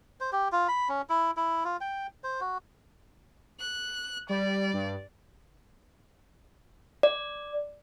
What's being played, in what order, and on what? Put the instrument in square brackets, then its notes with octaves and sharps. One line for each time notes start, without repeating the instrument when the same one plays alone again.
[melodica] C5
G4
F4
B5
C#4
E4
E4
F4
G5
C5
F#4
[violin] F#6
[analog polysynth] G3 [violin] D5
[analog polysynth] G2
[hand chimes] D5